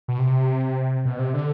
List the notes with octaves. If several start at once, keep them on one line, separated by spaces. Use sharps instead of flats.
B2
C3
B2
C3
D3